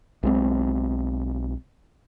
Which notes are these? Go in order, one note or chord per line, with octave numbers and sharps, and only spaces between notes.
B1 G#3 C4